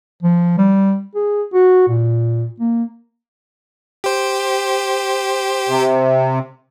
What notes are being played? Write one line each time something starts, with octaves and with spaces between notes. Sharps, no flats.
F3
G3
G#4
F#4
A#2
A#3
G4 C5
C3